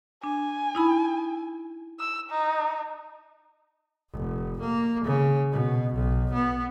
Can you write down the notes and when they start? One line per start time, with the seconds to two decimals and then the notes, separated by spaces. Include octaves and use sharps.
0.24 D4 G#5
0.75 D#4 E4 B5
2.00 E6
2.30 D#4
4.12 F1
4.61 A#3
5.05 C#3
5.52 B2
5.95 B1
6.33 B3